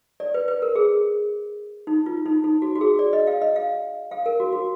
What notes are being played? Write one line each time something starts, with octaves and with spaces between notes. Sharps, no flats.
D5
B4
B4
A#4
G#4
D#4
F4
D#4
D#4
F#4
F#4
G#4
D5
D#5
F5
D#5
F5
F5
A#4
F#4
F#4